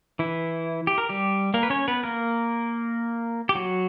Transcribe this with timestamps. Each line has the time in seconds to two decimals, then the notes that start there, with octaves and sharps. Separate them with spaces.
0.19 E3 E4
0.87 G4
0.98 A#4
1.09 G3 G4
1.54 A#3 A#4
1.63 B4
1.70 C#4 C#5
1.88 B3 B4
2.03 A#3 A#4
3.49 G4
3.55 F#3 F#4